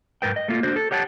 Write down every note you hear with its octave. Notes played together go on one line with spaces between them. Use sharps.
G#2 A#4 B4 G5
D#5
A3 A#3 F4
D4 F#4 C5
A4
G4 C#5 F#5 G5 A5